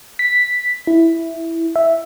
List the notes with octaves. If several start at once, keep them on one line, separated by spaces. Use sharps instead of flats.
B6
E4
E5